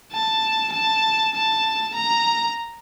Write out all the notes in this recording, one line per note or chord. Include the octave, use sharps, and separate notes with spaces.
A5
A5
A5
A#5